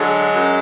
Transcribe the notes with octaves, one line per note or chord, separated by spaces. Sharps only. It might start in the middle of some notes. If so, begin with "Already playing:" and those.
Already playing: D3 F#3 G#3
F#2